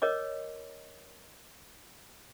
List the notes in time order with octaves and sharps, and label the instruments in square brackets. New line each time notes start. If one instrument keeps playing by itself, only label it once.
[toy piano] A#4 C#5 D#5 D6